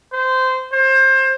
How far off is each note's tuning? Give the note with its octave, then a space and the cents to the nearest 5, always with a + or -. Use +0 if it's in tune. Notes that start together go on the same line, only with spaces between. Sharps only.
C5 -15
C5 +25